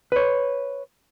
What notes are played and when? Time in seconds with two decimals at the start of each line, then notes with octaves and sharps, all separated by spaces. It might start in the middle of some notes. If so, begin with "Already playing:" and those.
0.12 B4 C#5